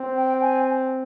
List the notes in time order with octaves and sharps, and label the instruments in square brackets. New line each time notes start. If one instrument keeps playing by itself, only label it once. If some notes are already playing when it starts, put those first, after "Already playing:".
Already playing: [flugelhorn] C4
[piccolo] G5
G#5